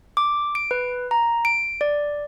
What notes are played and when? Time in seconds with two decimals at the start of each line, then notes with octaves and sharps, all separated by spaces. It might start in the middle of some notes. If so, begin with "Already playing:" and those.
0.17 D6
0.55 D7
0.71 B4
1.11 A#5
1.45 D7
1.81 D5